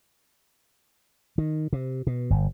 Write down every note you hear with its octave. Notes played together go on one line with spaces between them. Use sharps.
D#3
C3
B2
G1